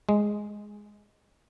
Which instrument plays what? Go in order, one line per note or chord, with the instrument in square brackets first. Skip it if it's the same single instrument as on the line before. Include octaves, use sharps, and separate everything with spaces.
[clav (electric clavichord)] G#3